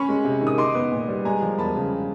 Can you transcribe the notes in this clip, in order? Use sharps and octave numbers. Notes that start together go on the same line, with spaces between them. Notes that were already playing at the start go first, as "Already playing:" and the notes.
Already playing: C#4 B5 C#6
G#3
C3
D#3
D#6
D#4 C6 D6
B3
A#2
G3
G#3 G#5 A#5
F3
E2 A5 B5
C#3